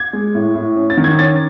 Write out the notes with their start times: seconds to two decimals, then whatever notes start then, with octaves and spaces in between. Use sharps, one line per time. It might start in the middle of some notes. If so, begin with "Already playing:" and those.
Already playing: G#6
0.13 G#3
0.35 A2
0.55 A2
0.76 C#4
0.90 A6
0.97 D#3
1.04 G#6
1.18 C#4 A6